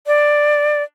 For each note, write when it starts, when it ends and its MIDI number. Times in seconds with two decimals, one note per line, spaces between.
0.07 0.83 74